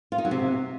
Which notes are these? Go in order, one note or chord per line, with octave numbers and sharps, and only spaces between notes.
F4
D#4
F#3
C3